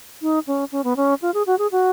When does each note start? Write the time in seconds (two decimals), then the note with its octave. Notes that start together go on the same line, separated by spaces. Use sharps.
0.22 D#4
0.47 C#4
0.72 C#4
0.84 B3
0.96 C#4
1.22 F4
1.34 G#4
1.47 F#4
1.58 G#4
1.72 F#4